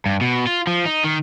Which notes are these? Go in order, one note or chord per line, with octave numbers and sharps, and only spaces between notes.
G2
B2
F4
F3
D#4
D#3